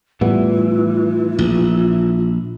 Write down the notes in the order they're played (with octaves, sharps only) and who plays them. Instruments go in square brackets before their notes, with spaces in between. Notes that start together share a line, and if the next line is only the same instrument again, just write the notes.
[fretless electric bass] A2 G3 B3 [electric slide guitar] E3 [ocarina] F4
[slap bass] A#1